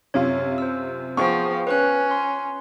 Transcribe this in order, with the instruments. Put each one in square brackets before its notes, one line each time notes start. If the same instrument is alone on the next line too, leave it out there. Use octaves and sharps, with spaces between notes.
[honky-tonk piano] F#2 C3 F4 [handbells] C#5
[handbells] C5 E6
[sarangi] F3 [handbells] B3 G#4 G5 [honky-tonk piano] C#6
[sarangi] C#4 [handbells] B4 F#6
[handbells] C6